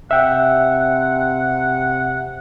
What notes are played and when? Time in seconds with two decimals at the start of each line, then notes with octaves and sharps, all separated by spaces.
0.11 C3 E5 F#5 G5